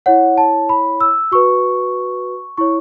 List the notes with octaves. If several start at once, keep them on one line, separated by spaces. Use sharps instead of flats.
E4 C#5 F#5
A5
B5
E6
F#4 B4 C#6
E4 C#5 C#6